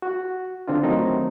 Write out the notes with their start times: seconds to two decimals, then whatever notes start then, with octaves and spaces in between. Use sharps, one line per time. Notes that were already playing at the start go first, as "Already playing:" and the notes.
0.02 F#4
0.68 D3 C4 D4 F4
0.83 D#3 F#3 A3 C4 D#4